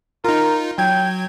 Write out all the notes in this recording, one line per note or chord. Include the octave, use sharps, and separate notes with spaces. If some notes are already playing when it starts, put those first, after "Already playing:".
D#4 F4 A#4
F#3 G5 G#6